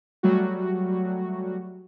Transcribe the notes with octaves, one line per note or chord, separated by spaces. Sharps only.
F#3 G3 A3 F#4